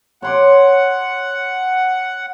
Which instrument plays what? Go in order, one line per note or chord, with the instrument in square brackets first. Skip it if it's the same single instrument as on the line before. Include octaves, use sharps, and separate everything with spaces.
[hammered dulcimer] C#5 C6 D6 [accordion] F#5